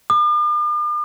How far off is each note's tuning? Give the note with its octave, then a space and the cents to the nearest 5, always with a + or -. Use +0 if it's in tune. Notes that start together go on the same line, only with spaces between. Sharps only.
D6 +45